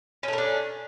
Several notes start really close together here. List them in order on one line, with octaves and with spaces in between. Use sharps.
C#4 A3 A#4 D4